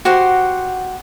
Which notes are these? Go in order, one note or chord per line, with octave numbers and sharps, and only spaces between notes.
F#4 G4 C5 F#5